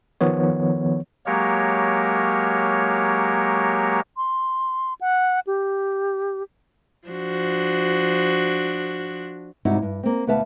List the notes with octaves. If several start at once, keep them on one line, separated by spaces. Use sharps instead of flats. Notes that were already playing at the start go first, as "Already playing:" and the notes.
D#3 F3 B3 C#5
F#3 G#3 A#3 G4 A#4 C#5
C6
F#5
G4
F3 D4 F#4
G#2 C3 G3 D#4 E4 F#4
G2
A#3 C4
D2 B2 B4 E5 F5 A5